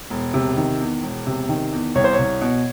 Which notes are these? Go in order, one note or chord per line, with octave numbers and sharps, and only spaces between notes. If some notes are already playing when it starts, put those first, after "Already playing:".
E1
C3
D#3
E2
E1
C3
D#3
E2
C2 C#5
C5
C#5
C2
B2